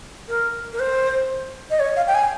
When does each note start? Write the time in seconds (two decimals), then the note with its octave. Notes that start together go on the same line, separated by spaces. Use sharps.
0.29 A#4
0.73 A#4
0.80 C5
1.70 D#5
1.80 C#5
1.96 F5
2.07 G5
2.14 G#5